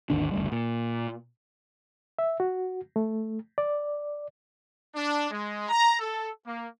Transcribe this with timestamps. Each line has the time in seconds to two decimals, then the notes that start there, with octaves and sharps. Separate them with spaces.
0.10 G#1 D#2 D3 D4
0.31 F#1 D2 G3
0.52 A#2
2.19 E5
2.40 F#4
2.96 A3
3.58 D5
4.95 D4
5.31 G#3
5.69 A#5
6.00 A4
6.45 A#3